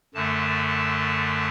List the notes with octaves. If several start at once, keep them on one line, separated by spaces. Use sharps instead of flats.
F#2 D3 A3 A5